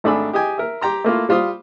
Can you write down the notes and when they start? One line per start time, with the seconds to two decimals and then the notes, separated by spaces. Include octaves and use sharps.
0.04 G#1 A3 D4 G#4 B5 E6
0.33 G4 G#4 D#5 G5 G#5
0.58 A#4 E5
0.81 G4 G5 A#5 C6
1.04 A3 A#3 E4 F4
1.29 G3 F4 C5 C6 D#6